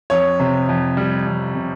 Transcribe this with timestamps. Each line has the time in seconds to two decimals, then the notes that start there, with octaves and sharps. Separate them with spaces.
0.10 F2 C#5
0.40 C3
0.69 F2
0.97 G3
1.27 F2
1.55 C3